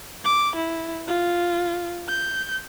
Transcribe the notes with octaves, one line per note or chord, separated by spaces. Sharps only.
D6
E4
F4
G6